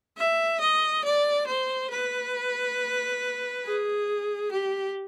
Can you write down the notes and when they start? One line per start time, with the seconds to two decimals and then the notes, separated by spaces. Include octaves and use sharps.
0.18 E5
0.61 D#5
1.04 D5
1.47 C5
1.91 B4
3.65 G#4
4.51 G4